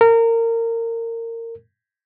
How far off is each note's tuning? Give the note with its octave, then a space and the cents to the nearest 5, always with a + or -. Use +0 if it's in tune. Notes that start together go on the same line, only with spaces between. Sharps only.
A#4 -25